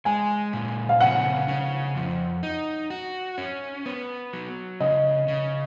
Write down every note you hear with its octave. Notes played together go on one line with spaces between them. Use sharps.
G#3 G#5
A#2
F5
C#3 F#5
C#3
F2
D#4
F#4
C#4
B3
F#3
C#3 D#5
C#3